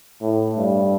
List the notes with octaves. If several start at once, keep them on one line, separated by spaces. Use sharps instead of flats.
A2
G2